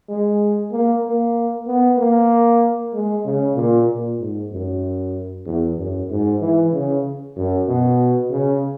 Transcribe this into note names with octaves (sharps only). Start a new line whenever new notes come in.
G#3
A#3
A#3
B3
A#3
G#3
C#3
A#2
A#2
G#2
F#2
E2
F#2
G#2
E3
C#3
F#2
B2
C#3